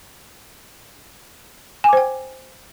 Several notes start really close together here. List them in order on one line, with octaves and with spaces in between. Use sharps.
G#5 D6 C5 G5